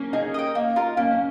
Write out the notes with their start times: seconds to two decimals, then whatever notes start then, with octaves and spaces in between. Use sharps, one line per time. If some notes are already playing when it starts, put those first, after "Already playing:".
Already playing: A#3 C#4
0.13 D#4 G#4
0.34 D#5 G5
0.55 A#3
0.76 F4 A#4
0.97 A#3 C#4
1.11 C#4